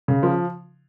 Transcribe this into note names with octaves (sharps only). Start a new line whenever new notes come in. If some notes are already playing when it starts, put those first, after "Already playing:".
C#3
F3